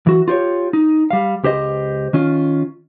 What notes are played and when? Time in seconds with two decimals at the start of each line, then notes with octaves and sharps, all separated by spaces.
0.07 E3 F#4
0.28 F4 G4 C5 C#5
0.73 D#4
1.10 G3 F5
1.43 C#2 G4 C5 D#5
2.13 D#3 C#4 F4